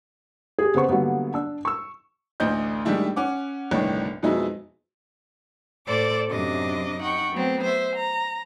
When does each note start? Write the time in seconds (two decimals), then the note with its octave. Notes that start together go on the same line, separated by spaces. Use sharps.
0.59 G4 G#4
0.74 C#3 B3 C5 C#6
0.89 D3 F#3 G3 A#3 B3
1.34 D4 E6
1.65 C#6 E6
2.40 A1 D2 D4 D#5 G6
2.85 A2 D#3 G3 G#3 D4 E4
3.16 C#4 F#5 D6
3.71 G1 C2 A2 D#3 D4 C#5
4.23 F2 B2 F#3 G#3 D#4 E4
5.86 A2 A4 C5 D5 D6
6.29 F#2 C3 D4 D#5 D6
7.00 D#4 F#5 G5 C#6
7.31 F#3 A3 B3 C4
7.61 C5 E5
7.96 A#5